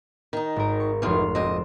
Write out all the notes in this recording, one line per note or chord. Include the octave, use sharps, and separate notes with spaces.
D#3 D#4
G#1 A#4
C#6
F1 F#2 D#3 E3 C6 F6
D2 A#2 C4 D#5